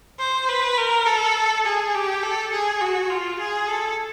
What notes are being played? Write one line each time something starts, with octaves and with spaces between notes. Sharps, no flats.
C5
B4
A#4
A4
G#4
G4
A4
G#4
F#4
F4
G#4
A4